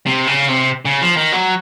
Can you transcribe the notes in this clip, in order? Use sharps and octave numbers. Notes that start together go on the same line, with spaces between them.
C3
C#3
C3
C#3
F3
D#3
F#3